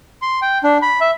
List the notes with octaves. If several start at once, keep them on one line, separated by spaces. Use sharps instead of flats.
C6
G5
D4
B5
E5